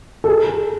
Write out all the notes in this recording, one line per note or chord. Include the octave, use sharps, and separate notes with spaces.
A4
G#4